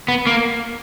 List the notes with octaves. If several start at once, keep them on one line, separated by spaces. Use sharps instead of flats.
B3
A#3